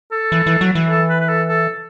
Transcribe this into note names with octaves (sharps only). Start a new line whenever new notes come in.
A4
E3
E3
F#3
E3
A4
B4
B4
A4
A4